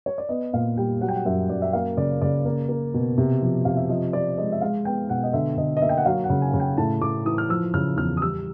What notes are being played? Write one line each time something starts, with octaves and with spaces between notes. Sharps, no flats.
C#5
D5
B3 D#5
A#2 F5
G3 G5
F#3 F#5
G5
F#5
F#2 E5
F#2 D5
E5
A#3 F5
C#3 D5
C#3 D5
A#3
A#3
B2
C3
F3
C3 F5
E5
F3 D#5
F3 D5
G#3 D#5
E5
G#3 F5
B3 G5
B2 F#5
D#5
D3 E5
D3 D#5
D#5
A#3 E5
G5
F#5
F#3 F5
F#5
C#3
G#5
C#3
G5
A2 A5
A2 D6
E3 D#6
F6
F3 E6
C#3 F6
E2 F6
D#6
G3 E6